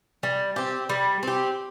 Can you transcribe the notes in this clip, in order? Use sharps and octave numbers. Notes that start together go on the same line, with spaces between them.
G3
C4 G4
G3
C4 G4